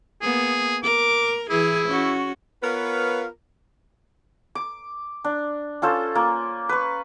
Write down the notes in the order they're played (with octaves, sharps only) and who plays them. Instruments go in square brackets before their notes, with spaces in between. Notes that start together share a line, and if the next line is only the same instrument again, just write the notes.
[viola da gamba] A#3 B3 [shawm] G#4
[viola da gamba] A#4 [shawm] D6
[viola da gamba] E3 G#4 [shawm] E4
[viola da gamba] C#4 F#4
[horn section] B3 F4 A#4 B4 C#5 F5
[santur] D6
D4
C#4 F4 A4 C5
A#3 F4
B4 C#6